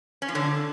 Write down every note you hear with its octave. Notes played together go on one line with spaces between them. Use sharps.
C#4
F3
D3